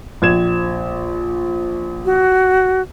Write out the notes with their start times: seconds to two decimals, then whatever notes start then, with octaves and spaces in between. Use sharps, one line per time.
0.22 A#1 G#6 E7
2.05 F#4